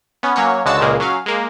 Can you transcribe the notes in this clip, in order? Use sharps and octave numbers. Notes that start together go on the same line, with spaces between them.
B3 C#4
F#3 A#3 C#4 C#5
C#2 D3 G#3 F#4 A5 E6
C#2 A#2 C#3 G#3 A#3
F#3 C#4 F5
G#3 A#3